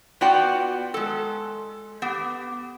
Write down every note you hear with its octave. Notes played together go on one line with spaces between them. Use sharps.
B3 F4 F#4 D5 G5
G#3 A4
B3 G4